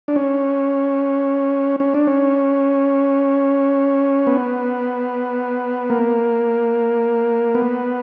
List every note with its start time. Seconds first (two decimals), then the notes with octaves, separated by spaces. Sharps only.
0.08 D4
0.16 C#4
1.80 C#4
1.94 D4
2.07 C#4
4.27 B3
5.90 A#3
7.55 B3